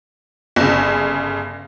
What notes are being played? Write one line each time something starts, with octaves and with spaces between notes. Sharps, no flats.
G1 C#3